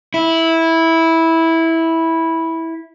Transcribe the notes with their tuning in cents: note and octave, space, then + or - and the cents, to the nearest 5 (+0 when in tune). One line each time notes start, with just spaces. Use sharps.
E4 -10